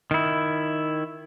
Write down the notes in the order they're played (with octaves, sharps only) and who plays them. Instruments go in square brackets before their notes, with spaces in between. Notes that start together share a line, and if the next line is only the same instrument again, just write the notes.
[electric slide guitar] D#3 E4